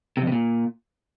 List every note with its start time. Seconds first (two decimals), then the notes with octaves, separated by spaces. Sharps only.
0.17 C3
0.22 F2
0.27 C3
0.32 A#2